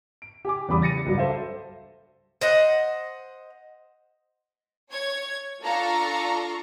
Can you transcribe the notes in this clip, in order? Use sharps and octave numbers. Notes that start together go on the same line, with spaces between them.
D7
G4 G#5 D6
E2 C#3 G3 B5 D6 D#6
A6 A#6 C#7 D#7
C#2 G2 F#3
A4 C5 E5 F5
C5 D#5 F#5
C#5 G#6
D4 F4 A4 F5 A#5 C#6